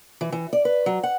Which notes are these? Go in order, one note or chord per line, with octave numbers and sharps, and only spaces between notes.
E3
E3
D5
B4
F#3
F#5